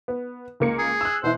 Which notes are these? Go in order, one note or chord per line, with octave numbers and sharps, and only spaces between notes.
B3
C#2 A#3 C#7
G#4
E6 F#6
B2 E3 E4 C5